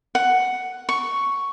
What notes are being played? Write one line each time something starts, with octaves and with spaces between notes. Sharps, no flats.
F#5
C#6